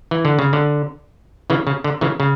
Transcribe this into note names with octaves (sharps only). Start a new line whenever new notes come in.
E3
D3
C#3
D3
C#3 E3
C#3
D3
C#3 E3
C#3